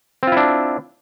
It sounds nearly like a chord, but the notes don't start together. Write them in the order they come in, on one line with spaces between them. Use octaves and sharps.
C4 F4 E4 D4